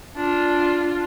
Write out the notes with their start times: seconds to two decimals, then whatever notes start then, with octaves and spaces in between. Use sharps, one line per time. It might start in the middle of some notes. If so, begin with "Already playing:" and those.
0.16 D4 F4